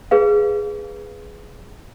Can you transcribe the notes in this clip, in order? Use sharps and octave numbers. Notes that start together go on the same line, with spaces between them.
G#4 B4 F5